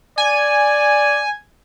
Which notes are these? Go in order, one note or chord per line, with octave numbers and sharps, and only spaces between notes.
D5 G#5